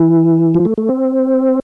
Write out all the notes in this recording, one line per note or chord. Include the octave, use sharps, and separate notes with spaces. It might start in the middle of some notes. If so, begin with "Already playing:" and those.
Already playing: E3
F3
A3
A3
C4